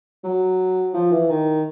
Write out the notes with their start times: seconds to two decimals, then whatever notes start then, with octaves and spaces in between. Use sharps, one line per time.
0.24 F#3
0.94 F3
1.12 E3
1.29 D#3